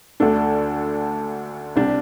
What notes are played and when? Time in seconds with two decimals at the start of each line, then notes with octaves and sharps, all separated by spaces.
0.20 D2 D3 A3 D4 A4
1.76 C2 C3 G3 D4 G4